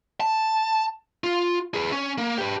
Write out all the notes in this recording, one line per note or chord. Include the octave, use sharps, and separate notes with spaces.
A5
F4
G#4 B4
C#4
A#3
G4 B4